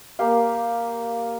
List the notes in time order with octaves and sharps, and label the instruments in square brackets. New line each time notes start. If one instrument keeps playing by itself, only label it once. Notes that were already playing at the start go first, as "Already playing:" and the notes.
[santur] A#3 G4 F5